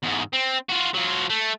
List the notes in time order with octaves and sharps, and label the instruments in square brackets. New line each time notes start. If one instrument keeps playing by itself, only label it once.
[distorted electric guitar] E2 G#2
C4
F4 F#4
F#3 F4
A3